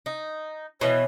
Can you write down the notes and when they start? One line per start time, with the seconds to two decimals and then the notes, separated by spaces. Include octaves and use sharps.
0.06 D#4
0.81 B2 E3 C#5